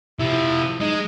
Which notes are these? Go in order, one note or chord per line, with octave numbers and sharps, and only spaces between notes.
C3 F3 E4
G#3 D#4